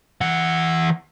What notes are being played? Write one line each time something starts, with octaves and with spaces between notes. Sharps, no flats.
E3 F#5